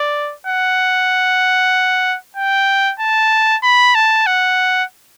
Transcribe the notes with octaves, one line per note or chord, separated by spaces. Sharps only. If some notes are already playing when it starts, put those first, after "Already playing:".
Already playing: D5
F#5
G5
A5
B5
A5
F#5